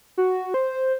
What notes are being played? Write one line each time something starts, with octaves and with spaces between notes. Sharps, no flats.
F#4
C5